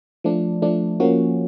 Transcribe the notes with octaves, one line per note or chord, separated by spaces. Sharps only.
F3 A3 D4
F3 A3 D4
F3 A#3 C#4 F#4